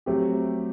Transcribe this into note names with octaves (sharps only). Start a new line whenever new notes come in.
F#3 A3 C4 G4